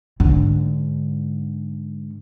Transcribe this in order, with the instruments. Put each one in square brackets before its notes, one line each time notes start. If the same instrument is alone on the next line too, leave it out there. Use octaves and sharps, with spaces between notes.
[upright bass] G#2 D3